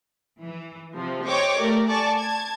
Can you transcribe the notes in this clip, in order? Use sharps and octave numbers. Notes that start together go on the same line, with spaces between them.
E3
C3 F3
C5 C#5 D#5 G5 C#6 D6
A3 G4 A#4 D5
D5 G#5 A5 C#6 D6
A5 G#6